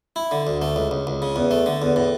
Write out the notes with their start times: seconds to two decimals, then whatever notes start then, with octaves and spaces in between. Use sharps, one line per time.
0.16 E4
0.31 D3
0.47 D2
0.62 A3
0.76 C#2
0.91 C#2
1.07 C#2
1.22 C#3
1.36 E2
1.51 A3
1.66 D3
1.82 E2
1.96 A2